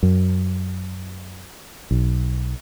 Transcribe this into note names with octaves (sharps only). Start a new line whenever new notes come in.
F#2
B1